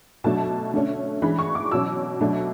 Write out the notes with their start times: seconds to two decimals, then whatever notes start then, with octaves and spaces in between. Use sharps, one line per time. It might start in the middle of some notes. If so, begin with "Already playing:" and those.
0.24 B2 F#3 A3 D4 A5
0.74 D3 A3 C#4
1.22 E3 G#3 D4 B5
1.39 C#6
1.55 D6
1.71 B2 F#3 C#4 E6
2.21 B2 F#3 A3 D4